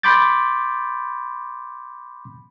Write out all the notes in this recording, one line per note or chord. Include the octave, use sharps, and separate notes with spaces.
B5 C6 D6 G6 A6